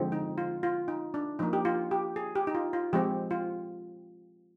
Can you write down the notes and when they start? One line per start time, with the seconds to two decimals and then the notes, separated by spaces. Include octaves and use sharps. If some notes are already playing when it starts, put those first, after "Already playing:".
Already playing: D3 F3 G#3 C4
0.12 D#4
0.38 F4
0.63 F4
0.88 D#4
1.14 D4
1.39 F3 A#3 D#4
1.53 G4
1.65 F4
1.91 G4
2.16 G#4
2.35 G4
2.47 D#4
2.55 F4
2.73 F4
2.93 F3 G#3 C4 G4
3.31 F4